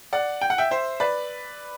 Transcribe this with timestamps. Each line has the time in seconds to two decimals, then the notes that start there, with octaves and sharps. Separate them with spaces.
0.13 D5 F#5
0.41 G5
0.50 F#5
0.58 E5 G5
0.71 C5 E5
1.00 B4 D5